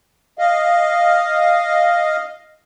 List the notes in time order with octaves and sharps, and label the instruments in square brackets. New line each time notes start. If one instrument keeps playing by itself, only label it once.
[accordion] D#5 F5